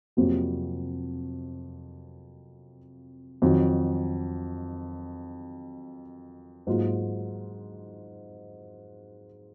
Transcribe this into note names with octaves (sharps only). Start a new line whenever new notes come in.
F2 C3 F#3 A#3
F2 D#3 F#3
G#2 F#3 A#3 F4